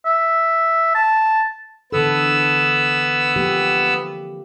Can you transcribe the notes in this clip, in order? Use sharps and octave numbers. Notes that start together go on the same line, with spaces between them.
E5
A5
D3 E3 B3 A4 E6
F3 A#3 G4